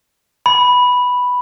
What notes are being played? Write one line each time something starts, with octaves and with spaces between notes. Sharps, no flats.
B5